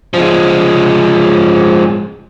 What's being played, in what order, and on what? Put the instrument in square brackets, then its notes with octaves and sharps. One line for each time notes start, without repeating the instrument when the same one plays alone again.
[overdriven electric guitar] F3 G#3